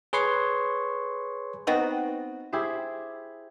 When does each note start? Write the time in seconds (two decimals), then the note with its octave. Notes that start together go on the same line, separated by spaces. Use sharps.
0.13 G#4 B4 C#5 C6 C#6
1.67 B3 C4 D#4 F#4
2.53 E4 G4 G#4 C5